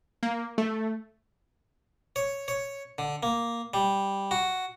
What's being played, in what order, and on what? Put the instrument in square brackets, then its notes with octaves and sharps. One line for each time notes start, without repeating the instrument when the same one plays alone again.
[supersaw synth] A#3
A3
[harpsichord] C#5
C#5
D3
A#3
G3
F#4